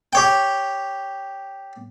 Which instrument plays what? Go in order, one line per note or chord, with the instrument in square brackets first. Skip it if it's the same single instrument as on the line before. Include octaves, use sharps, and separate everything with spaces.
[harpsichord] G4 C#5 G5